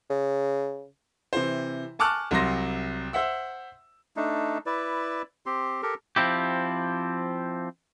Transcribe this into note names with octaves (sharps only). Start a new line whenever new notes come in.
C#3
C3 E3 C5
G#5 A5 C#6 D6 F6 F#6
C2 C3 F#3 C6 A#6
C5 E5 F#5 E6
A3 D4 D#4
E4 B4 D5
C4 G4 C6
G4 A4 A#4
F3 C4 E4 G4